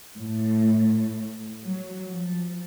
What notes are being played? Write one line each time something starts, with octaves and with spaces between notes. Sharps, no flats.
A2
F#3
F3